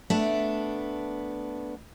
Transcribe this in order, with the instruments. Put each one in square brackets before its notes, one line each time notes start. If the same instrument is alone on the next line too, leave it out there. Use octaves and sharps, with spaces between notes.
[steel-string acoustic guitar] A3 B3 D4